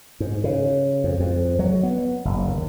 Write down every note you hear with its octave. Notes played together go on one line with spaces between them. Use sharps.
G#2
C#3
F2
F2
F#3
B3
F#1
D#2